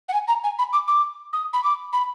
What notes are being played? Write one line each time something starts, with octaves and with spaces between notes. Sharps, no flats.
F#5
G#5
A#5
G#5
B5
D6
D6
D#6
B5
D6
B5